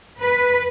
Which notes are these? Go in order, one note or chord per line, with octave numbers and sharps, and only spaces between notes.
B4